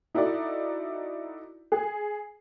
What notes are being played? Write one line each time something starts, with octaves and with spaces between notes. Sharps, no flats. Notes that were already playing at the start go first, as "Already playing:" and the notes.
D#4 E4 F#4 A4 D5
G#4